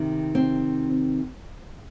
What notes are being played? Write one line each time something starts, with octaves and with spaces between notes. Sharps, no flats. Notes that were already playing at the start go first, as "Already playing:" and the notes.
Already playing: C3 D#3
C4